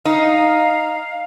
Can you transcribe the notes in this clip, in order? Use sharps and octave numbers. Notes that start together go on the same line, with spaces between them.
D#4 F5